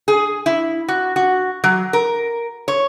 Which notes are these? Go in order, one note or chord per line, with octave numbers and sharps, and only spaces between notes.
G#4
E4
F#4
F#4
F#3
A#4
C#5